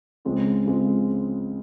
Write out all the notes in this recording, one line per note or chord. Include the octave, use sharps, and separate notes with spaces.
C#2 C#3 G#3 C4 F4
C#2 C#3 G#3 C4 F4